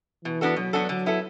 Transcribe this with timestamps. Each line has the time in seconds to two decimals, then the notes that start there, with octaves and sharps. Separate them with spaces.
0.24 B2 E3
0.41 B3 D4 F#4 A4
0.56 B2 F#3
0.73 B3 D4 F#4 A4
0.89 D3 F#3
1.06 B3 E4 A4